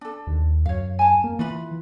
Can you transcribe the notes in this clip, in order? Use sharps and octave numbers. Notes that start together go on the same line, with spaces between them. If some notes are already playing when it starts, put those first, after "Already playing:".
D4 A4
D#2
F#2 C#5 F5
G#5 A5
A#3
E3 F4 B4 B5